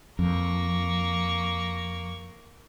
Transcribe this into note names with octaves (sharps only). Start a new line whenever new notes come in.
F2 A#3 C#6